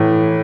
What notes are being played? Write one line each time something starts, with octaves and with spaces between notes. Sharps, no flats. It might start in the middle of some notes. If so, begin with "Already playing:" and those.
Already playing: A2 E3